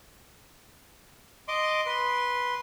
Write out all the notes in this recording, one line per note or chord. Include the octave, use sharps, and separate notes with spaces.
D#5 C6 D6
B4 C6